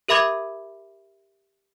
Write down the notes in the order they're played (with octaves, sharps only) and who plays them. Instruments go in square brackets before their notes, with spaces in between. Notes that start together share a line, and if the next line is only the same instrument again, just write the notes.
[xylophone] G4 A#4 E5 B5 D6 G#6